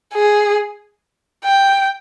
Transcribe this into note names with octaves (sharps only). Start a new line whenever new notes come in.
G#4
G5